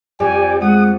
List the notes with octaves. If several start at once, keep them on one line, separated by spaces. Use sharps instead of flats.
F2 G4 D5 G#5
G#3 A3 F#5 D#6